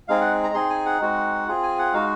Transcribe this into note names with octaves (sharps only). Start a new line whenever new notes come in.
G#3 C4 D#4 G#4 F5
F#5
A#5
C4 D#4 G#4 C6
G#5
F#5
G#3 C4 D#4 F#4
C4 F4 G#4
G#5
F#5
G#3 D#4 F#4 F5